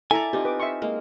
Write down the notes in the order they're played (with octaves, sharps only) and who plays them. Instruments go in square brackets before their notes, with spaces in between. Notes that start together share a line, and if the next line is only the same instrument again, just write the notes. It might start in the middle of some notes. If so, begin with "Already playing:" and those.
[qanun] E4 D5 D6 [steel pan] A4 A#5 [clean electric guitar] G#5
[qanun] C4 D#4 F4 [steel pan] G4
[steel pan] B4 D6
E5 C6 C#6
[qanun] G#3 A#3